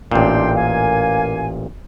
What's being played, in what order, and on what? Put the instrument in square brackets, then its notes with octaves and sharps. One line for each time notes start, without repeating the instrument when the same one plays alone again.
[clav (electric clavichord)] A1 A#2 [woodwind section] D4 G5 C6
[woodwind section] A#3 F5 G#5